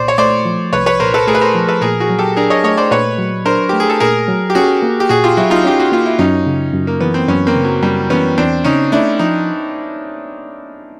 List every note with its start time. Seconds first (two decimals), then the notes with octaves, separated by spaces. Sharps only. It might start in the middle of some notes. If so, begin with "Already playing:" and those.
Already playing: C2 A#2 C5 D5
0.08 C#5
0.18 A3 C5 D5
0.45 F3
0.73 C2 B4 C#5
0.86 B4 C#5
1.00 A#2 A#4 C5
1.14 A4 B4
1.27 A3 G#4 A#4
1.35 B4
1.41 A#4 C5
1.55 F3
1.68 A4 B4
1.82 A#2 G#4 A#4
2.00 F#4 G#4
2.09 F#3
2.19 G4 A4
2.37 D4 G#4 A#4
2.50 C#5 D#5
2.64 A3 C#5 D#5
2.77 C5 D5
2.91 A#2 B4 C#5
3.19 F#3
3.46 D4 A#4 C5
3.69 A3 G4
3.80 G#4
3.90 A4
4.00 A#2 G#4 A#4
4.28 F#3
4.50 G4
4.55 C#4 F#4 G#4
4.82 A#3
5.00 G4
5.09 A#2 F#4 G#4
5.24 F4 G4
5.37 F#3 E4 F#4
5.50 D#4 F4
5.65 C#4 G4
5.80 F#4
5.92 A#3 F4
6.06 E4
6.18 F#2 C#4 D#4
6.46 C#3
6.74 F#2
6.87 A#3
7.01 E3 B3
7.14 C4
7.28 F#2 B3 C#4
7.47 A#3 C4
7.55 C#3
7.64 F#3
7.83 F#2 G3
8.10 E3 B3 C#4
8.38 E2 C4 D4
8.64 C#3 C#4 D#4
8.92 A3 D4 E4
9.19 F3 D#4